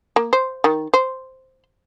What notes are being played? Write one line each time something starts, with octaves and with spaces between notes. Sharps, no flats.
A#3
C5
D#3
C5